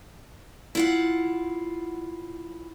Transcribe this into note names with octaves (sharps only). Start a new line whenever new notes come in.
E4 F4 F#5